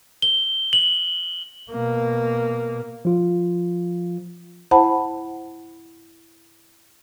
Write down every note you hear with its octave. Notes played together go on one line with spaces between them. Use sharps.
G7
F#7
B2 A#3
F3 F4
E4 C5 F#5 A5 B5